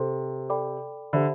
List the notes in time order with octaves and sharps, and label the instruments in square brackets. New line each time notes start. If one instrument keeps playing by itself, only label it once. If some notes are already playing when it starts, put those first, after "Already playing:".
Already playing: [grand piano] C3 [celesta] A4 C5 G5 C6
[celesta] A4 D5 G5 B5 D6
[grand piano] D3 [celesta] G4 C5 E5 B5